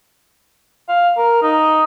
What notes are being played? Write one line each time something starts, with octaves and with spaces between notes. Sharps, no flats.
F5
A#4
D#4